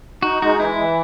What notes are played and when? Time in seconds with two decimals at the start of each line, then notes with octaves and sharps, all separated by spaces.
0.23 D#4 F#4
0.42 G#3 F#4
0.60 E3 E4
0.79 E3